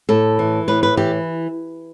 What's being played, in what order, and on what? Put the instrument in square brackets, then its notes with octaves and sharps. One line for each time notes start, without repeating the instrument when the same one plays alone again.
[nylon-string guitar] A2 A4
E3
A2 B4
B4
E3 G4